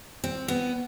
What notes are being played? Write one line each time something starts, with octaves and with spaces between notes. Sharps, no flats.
C4
B3